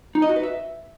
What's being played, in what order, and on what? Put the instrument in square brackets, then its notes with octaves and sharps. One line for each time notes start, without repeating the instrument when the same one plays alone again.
[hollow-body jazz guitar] D#4
D#5
F#4
B4
E5